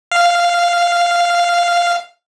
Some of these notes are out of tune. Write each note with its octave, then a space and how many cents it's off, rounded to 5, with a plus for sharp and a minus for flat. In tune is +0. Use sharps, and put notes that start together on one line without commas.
F5 -5